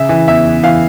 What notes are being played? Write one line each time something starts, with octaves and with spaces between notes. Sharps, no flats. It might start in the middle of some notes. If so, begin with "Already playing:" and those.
Already playing: C#3 E5
E3
E2 E5
E2
E3 F5